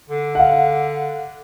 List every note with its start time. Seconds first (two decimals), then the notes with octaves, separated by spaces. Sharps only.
0.10 D3
0.35 F5 F#5